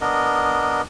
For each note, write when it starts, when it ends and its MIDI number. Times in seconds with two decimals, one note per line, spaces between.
0.01 0.82 59
0.01 0.82 62
0.01 0.82 70
0.01 0.82 75